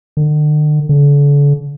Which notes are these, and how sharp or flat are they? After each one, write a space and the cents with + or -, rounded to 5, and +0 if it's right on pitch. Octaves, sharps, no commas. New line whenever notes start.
D3 +45
D3 -40